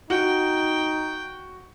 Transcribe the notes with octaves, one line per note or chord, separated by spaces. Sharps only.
D#4 F#4 G5